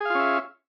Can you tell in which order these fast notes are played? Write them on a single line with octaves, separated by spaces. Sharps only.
G#4 F5 F4 C#4 E5